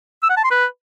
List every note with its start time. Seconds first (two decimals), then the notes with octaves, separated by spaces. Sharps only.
0.23 E6
0.30 F#5
0.37 A5
0.44 C6
0.51 B4